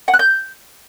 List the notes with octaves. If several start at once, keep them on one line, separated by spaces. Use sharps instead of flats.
F#5
F#6
G6